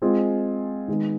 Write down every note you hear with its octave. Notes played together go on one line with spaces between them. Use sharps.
G#3 C4 F4 G#4
D#3 G#3 B3 D#4